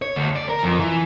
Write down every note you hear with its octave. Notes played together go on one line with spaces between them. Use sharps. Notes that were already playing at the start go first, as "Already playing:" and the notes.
C#5
D2
D5
A#4
F2
E3